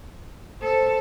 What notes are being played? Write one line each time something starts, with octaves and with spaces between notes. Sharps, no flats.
A4 C5